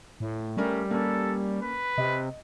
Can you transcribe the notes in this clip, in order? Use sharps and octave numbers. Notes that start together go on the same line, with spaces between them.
A2
G3 A3 C#4 A#4
A#3 C#4 A4
B4
C3 D#5